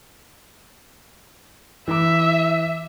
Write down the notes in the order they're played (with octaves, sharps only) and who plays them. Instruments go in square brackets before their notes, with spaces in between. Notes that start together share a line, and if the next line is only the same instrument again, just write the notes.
[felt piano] E3 D6 [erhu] E5